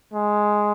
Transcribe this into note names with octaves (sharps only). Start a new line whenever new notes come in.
G#3